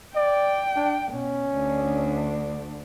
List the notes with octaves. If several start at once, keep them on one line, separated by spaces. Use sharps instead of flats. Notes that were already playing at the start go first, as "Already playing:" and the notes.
D5 G5
D4
B2 C#4
D2 D4